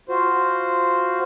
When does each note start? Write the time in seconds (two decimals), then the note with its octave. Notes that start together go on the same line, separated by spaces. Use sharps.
0.09 F4 F#4 C5